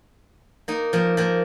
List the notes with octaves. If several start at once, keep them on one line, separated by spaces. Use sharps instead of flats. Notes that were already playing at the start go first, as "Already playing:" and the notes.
A#3 D#4
F3 A#3
F3 A#3